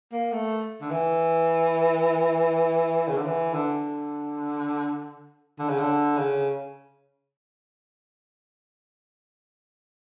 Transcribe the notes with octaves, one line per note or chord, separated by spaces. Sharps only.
A#3
A3
D3
E3
C#3
D3
E3
D3
D3
C#3
D3
C#3